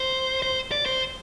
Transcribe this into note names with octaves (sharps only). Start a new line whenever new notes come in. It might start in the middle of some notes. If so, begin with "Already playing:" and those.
Already playing: C5
C5
D5
C5